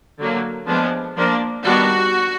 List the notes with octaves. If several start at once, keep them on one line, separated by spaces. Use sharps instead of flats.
D3 F#3 A#3
F3 G#3 B3 D4
F3 A#3 D4
D#3 G3 B3 D4 F#4